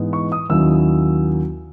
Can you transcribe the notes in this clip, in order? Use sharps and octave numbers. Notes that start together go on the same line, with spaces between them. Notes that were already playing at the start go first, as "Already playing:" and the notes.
Already playing: G#2 E3 G#3 B3 D#4
C#6
D#6
D#2 D#3 F#3 C#4 E4 E6